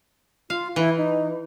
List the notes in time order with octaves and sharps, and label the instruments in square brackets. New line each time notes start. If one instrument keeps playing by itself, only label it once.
[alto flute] F4 [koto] F5
[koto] E3 [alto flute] E4
[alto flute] D#4